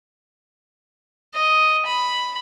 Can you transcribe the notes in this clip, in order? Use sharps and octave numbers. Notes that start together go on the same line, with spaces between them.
D#5
B5